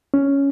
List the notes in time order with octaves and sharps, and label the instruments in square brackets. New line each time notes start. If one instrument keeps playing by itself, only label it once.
[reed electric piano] C#4